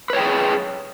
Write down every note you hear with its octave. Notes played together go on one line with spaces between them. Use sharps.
G#4 B4 C#5 G5